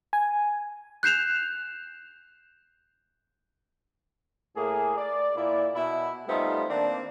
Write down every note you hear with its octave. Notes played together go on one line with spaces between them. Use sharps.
G#5
F#6 G6 C7 E7 F7
A2 A#3 G#4
D5
A#2 E4 D5
B2 E4 E5
G3 A3 B3 C4 D#4 F4
D#3 A#3 C4 D4